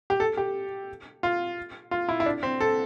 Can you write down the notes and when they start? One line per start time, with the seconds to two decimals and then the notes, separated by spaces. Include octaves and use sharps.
0.10 G4
0.20 A4
0.37 G4
1.23 F4
1.91 F4
2.09 E4
2.20 E4
2.26 D4
2.43 C4
2.60 A4